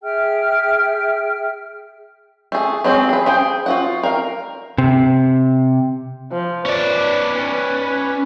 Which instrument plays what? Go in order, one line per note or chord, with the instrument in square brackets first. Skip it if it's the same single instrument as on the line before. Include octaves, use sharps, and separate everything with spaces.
[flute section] G#4 E5 G5 F6
[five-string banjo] A3 G#4
F#3 G#3 C4 D#4 G#4
G#4 B4
G#4 C5 G5
F4 F#4 F#5
A#4 F5
[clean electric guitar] C3
[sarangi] F3
[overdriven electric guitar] C#4 D5 [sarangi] B4
[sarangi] B4